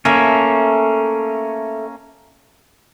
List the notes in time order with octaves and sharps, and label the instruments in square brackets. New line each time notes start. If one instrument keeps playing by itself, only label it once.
[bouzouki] A3 E5 [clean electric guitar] A#3 C#4